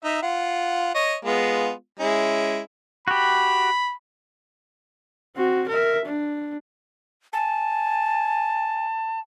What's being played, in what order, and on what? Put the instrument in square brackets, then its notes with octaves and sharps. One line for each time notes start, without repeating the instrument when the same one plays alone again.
[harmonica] D#4 E5
F4 F#5
C#5 D#5
G#3 B3 F4
G#3 C#4 E4
[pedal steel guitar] F#4 G4 [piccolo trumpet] B5
[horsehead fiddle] C4 F#4
A#4 E5
D4
[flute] G#5 [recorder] A5